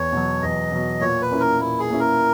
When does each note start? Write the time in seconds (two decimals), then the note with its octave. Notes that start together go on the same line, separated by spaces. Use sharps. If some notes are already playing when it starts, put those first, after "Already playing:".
Already playing: E2 C#5
0.13 B2 F#3
0.42 E2 D#5
0.72 B2 F#3
1.01 A#2 C#5
1.21 B4
1.31 A#3 C#4 E4
1.40 A#4
1.60 A#2 E4
1.80 G#4
1.90 A#3 C#4 E4
2.00 A#4